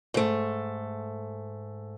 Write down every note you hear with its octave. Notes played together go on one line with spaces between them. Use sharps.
G#2 A3